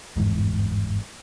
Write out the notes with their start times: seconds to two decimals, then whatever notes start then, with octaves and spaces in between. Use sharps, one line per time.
0.16 G1 E2 G#2